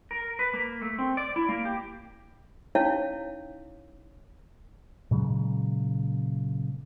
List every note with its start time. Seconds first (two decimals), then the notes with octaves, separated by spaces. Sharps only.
0.11 A#4
0.39 B4
0.54 A#3
0.82 A3
0.98 C4
1.17 D5
1.36 E4
1.49 A#3
1.65 G4
2.75 C#4 D#4 E4 C#5 F5 A5
5.11 A#2 C#3 F#3 G#3